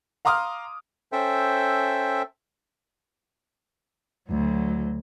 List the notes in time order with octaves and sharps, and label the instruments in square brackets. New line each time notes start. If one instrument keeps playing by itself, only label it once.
[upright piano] F5 A#5 C6 D6 D#6 F6
[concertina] C#4 A4 C5 E5 G5
[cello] D2 F#3